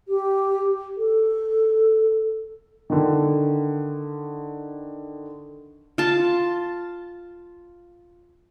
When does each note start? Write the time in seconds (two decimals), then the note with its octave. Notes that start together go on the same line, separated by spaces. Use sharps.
0.08 G4
0.97 A4
2.90 D3 D#3
5.98 F4 A5